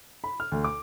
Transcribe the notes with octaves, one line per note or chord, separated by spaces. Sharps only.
B5
F6
D2
D6